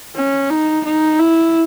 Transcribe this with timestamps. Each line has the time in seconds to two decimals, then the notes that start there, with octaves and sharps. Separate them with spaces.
0.15 C#4
0.50 D#4
0.85 D#4
1.19 E4